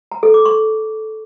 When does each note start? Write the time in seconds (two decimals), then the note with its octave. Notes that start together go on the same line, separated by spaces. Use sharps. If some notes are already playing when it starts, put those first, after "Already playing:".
0.12 A#5
0.23 A4
0.34 D6
0.45 C#6